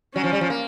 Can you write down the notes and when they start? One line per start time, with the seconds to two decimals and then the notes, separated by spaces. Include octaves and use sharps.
0.15 F#3 C#4
0.24 F3
0.33 G3
0.41 F3
0.50 A#3